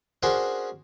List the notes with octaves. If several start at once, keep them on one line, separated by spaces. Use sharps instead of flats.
C#4 D4 F#4 G#4 A#4 C5